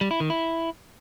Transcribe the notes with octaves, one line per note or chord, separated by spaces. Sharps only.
G3
E4
D#3
E4